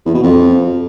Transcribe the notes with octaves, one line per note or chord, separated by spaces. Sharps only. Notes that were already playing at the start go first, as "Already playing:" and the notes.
E2
B2
F2